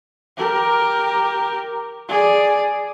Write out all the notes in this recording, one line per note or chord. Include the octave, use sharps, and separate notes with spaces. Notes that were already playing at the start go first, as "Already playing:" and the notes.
G4 A#4
G#4 D5